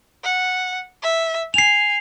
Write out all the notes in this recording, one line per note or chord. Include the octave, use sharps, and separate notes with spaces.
F#5
E5
G#5 C7 F7